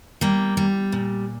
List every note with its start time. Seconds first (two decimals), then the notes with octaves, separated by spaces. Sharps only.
0.21 G3 A#3
0.57 G3
0.92 A#2